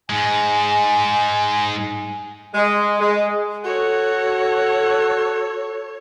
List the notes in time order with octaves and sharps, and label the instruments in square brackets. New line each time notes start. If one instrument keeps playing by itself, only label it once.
[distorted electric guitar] G#2 G#3 [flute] G#5
[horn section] G#3
G#3
[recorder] F#4 [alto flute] A4 [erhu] C#5 [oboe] F#5